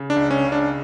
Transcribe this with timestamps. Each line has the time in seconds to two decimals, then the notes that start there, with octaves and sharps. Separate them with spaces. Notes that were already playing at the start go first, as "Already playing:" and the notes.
Already playing: C#3
0.10 D4
0.16 C#2
0.31 C#4
0.46 C#3
0.52 D4